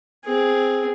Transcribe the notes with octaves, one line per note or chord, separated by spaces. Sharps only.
C4 G#4